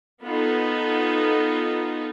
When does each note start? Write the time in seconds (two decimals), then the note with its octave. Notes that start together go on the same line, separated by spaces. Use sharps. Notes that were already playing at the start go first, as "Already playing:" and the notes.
0.22 B3 D#4 F4 A4